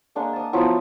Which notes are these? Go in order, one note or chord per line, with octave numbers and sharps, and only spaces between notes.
G#3 A#3 D4 F#5
A5 D#6
F3 F#3 B3 E4